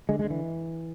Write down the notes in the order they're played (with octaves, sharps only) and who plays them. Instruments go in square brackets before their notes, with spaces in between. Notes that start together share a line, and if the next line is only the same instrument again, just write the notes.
[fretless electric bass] D3 G#3
G#3
D3
E3